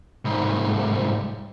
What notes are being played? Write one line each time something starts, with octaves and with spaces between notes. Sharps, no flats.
C2 G#2